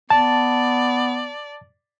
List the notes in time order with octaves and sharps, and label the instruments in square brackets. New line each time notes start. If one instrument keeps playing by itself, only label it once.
[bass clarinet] B3 [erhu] D5 [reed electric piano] A5